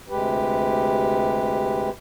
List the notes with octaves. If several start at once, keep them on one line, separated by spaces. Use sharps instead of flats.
D2 C3 G#3 G4 B4